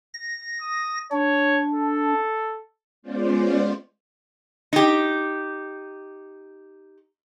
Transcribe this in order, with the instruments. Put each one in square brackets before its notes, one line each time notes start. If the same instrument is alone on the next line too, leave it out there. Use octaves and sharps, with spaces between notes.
[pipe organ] A#6
[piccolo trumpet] D#6
[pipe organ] D4 [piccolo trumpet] C#5
[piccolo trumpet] A4
[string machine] G#3 B3 C#4 F4 C5 D5
[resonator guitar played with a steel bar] D#4 G4